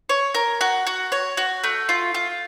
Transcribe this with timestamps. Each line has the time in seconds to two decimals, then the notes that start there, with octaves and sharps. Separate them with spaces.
0.09 C#5
0.34 A#4
0.61 F#4
0.87 F#4
1.12 C#5
1.37 F#4
1.64 A3
1.89 F4
2.14 F4